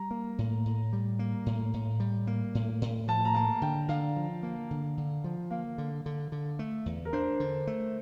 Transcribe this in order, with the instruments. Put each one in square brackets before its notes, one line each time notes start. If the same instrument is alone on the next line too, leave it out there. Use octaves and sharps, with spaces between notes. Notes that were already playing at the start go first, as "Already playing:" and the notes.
Already playing: [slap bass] G3 [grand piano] A#5
[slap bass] A#3
A2
A2
G3
A#3
A2
A2
G3
A#3
A2
A2
[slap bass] F3 [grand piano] A5
[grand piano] A#5
[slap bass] A#3 [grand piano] A5
[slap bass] D3 [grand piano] G5
[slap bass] D3 [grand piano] F5
[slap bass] F3
A#3
D3
D3
F3
[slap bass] A#3 [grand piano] F5
[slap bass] D3
D3
D3
A3
E2
[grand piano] A#4
[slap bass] D4 [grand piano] C5
[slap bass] D3
A3